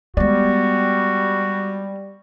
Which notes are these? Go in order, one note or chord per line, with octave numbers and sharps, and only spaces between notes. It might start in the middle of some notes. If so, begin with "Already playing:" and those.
G3 G#3 B3 F#4 D5